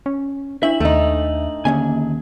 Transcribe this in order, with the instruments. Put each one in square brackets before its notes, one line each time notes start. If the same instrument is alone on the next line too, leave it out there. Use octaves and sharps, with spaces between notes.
[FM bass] C#4
[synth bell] D4 F#7 [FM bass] E4 [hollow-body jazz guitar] E5
[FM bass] D#2 [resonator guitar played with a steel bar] A3 D#4
[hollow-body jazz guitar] D#2 C#4 G#5 [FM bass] D3 [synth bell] A#3